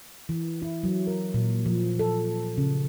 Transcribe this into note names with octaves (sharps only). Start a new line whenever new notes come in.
E3
E4
F#3
A#4
A#2
F3
A4
C#3